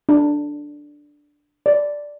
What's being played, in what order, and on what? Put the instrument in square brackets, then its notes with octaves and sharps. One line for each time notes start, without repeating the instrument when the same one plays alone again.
[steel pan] D4
D5